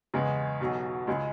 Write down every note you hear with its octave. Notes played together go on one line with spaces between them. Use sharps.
E2 C#3 E3 G#3
B1 B2 F#3
C#2 C#3 G#3